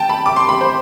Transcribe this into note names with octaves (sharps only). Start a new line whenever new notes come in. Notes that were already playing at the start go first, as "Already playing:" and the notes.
Already playing: G5 A5
B5
D6
C6
B5
C5